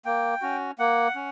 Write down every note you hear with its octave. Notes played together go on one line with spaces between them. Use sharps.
A#3 G5
C#4 F#4
A#3 F#5
C#4